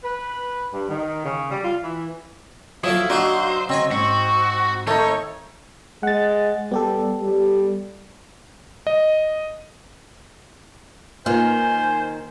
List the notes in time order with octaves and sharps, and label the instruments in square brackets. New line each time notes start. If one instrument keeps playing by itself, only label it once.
[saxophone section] B4
G2
D#3
C#3
G3
F4
E3
[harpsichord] F3 F#3 A4 [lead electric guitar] E4 [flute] F5 [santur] D#6
[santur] F#3 [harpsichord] D4 D#4 F#4 [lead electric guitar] C5
[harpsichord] C#3 C#5 G#5 [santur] C4 [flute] D#5
[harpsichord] G#2 [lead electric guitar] F#4 [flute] C#6
[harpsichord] D#3 [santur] A3 D#4 [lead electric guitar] C#5
[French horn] G#3 [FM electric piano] F#5 A6
[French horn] G3 [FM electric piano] B3 G4 A4
[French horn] G3
[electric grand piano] D#5
[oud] D#3 [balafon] A#3 F4 B4 [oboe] C5 [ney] G#5